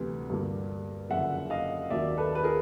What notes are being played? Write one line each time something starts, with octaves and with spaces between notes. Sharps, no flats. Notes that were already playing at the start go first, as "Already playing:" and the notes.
Already playing: D2 C3 E3 G3 B3
G2 D3 G3 A#3
F#1 F2 D3 E5 F#5
D#5 F5
D#2 D#3 F#3 A#3 D5 E5
A4 B4
B4
G#4 A#4